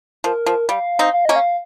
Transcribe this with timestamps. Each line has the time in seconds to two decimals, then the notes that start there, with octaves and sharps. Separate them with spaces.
0.24 F3 A#4
0.46 F3
0.69 G3 F5
0.99 C4 D#4
1.14 F5
1.25 A#3 C#4 D#5
1.36 F5